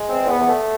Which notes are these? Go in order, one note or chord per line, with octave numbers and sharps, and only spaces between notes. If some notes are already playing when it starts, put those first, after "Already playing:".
Already playing: G#3
E2 C4
E2 B3
E2
A3